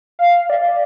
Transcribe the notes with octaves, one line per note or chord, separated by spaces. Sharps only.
F5
D5